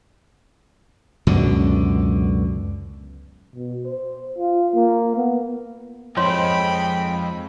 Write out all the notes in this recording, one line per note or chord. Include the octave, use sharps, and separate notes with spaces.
C#2 F#2 B2 D3
B2
C5
F4
A#3
B3
F2 G#2 F4 C#5 G5 B5 C6